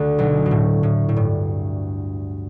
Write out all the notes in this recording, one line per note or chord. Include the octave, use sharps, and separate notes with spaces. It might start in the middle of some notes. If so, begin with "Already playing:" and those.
Already playing: D2 D3
B1 B2
B2
A2
A2
A2
G2